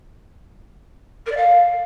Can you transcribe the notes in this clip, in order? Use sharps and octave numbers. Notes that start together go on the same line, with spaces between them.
A#4
D5
F5